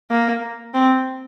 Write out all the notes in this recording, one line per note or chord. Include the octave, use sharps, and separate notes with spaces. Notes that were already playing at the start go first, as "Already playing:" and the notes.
A#3
C4